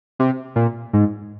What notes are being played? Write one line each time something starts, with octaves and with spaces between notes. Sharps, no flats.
C3
A#2
G#2